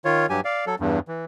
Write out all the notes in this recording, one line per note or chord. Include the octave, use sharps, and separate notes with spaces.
D#3 F4 C#5
G2 F#3 G4 G#5
D5 F5
F#3 A4
E2 G2
E3